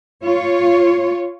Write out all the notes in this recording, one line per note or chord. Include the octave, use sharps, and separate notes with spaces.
F4 C#5